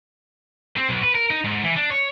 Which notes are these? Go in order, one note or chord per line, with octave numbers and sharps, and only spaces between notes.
C4
B1
B4
A#4
D#4
G#2
E3
D4
C#5